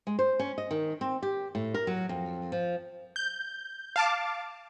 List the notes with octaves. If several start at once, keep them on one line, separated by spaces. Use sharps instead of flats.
G#3
C5
C#4
D#5
D#3
C4
G4
A2
A#4
F#3
F2
F3
G6
F5 A5 D6